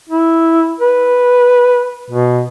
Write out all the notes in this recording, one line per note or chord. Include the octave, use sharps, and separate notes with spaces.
E4
B4
B2